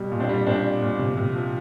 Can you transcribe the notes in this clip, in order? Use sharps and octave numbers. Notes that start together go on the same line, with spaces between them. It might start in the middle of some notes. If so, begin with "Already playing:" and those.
Already playing: B2 G3
A#2
C4 D4
G3
A#2 C4 D4
G3
A#2
C3
C3
F3